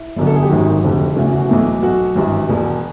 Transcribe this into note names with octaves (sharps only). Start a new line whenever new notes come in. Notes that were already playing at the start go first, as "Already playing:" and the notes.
Already playing: E4
G1 F#2 D3
A4
G#4
G4
G#1 F#2 D#3 F#4
F1 F2 D3
E1 D2 C#3 E3 F#4
F#4
B1 A2 E3
B1 B2 F#4
G#1 G2 E3
E1 E2 B2